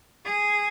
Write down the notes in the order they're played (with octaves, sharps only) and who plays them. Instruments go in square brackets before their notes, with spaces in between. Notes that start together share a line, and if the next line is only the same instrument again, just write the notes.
[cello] G#4